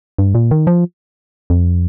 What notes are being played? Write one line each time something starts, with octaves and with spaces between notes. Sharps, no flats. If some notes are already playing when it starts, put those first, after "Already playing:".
G2
A#2
D#3
F3
F2